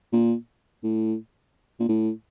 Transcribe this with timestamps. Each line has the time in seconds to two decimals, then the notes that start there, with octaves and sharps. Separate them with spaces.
0.13 A#2
0.83 A2
1.80 A#2
1.89 A2